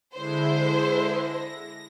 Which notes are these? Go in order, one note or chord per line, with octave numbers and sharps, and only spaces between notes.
D3 G#3 E4 C5
A#6